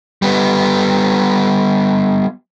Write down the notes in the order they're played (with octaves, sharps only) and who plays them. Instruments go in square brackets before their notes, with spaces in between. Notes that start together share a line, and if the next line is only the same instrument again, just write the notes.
[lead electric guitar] G3 B3